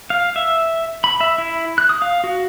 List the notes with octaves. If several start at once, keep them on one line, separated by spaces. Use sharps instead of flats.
F5
E5
B5
E5
E4
F#6
D#6
F5
F#4